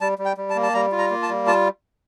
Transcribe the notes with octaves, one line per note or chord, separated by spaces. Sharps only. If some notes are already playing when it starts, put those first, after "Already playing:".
G3 A5
G3
G5
G3
A5
A#3
A5
G3 A#5
F4
A#5
A#3
A5
G3
F4 A5